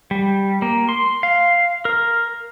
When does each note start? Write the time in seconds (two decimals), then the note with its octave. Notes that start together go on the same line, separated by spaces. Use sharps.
0.11 G3
0.62 A#3
0.89 C6
1.23 F5
1.85 A#4